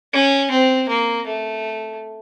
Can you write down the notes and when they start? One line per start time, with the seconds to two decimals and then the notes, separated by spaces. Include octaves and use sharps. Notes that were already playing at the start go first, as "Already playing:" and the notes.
0.13 C#4
0.51 C4
0.89 A#3
1.27 A3